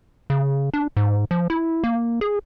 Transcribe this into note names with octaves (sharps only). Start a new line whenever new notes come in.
C#3
D4
G#2
F3
E4
A#3
G#4